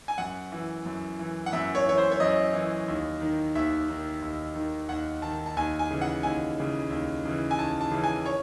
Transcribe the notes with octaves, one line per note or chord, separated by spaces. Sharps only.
G#5
F#2 F#5
E3
F#2
E3
F#5
F#2 E5
C#5
E3 C#5
C5
C#5
F#2 D#5
E3
D#2
D#3
D#2 E5
D#3
D#2
D#3
D#2 F#5
D#3 A5
A5
D#2 G#5
G#5
C#3 E3
F#5
D#2 G#5
C#3 E3
D#2
C#3 E3
G#5
D#2 A5
A5
C#3 E3
G#5
C#5